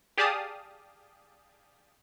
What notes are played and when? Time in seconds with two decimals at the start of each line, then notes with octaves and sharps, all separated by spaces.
0.17 G4 G#4 D5 F5 A5 D#6